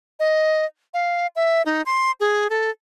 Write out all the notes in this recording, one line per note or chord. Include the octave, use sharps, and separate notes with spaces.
D#5
F5
E5
D#4
C6
G#4
A4